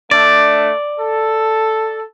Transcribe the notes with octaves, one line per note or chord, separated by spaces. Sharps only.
A3 D4 D5
A4